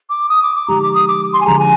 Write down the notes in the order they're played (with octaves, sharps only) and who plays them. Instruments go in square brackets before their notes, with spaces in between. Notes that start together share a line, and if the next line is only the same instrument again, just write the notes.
[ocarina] D6
D#6
D6
D6
[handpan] D3 F3 G#3 D#4 G4 [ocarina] A#5
[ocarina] D6
D#6
D6
C6
G#5
[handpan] D3 F3 G#3 D4 G#4 [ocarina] A#5
[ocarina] G#5